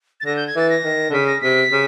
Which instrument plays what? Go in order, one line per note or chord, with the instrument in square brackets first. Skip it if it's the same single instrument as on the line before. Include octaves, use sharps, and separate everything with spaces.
[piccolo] A6
[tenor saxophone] D3 [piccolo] A#6
[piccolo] G6
G#6
[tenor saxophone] E3 [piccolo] A6
[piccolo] A#6
[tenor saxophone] D#3
D3
[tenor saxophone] C#3 [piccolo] B6
[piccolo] A#6
[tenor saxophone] C3 [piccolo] B6
[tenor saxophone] C#3